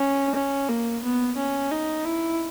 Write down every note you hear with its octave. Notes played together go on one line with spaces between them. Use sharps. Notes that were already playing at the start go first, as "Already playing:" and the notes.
Already playing: C#4
C#4
A#3
B3
C#4
D#4
E4